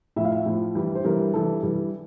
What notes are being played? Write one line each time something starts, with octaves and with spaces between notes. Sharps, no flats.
A2 F3 E5
F5
E5
A2 F3
G2 E3 G3
C5
G2 E3 G3 A#4
G2 E3 G3 A4
G2 E3 G3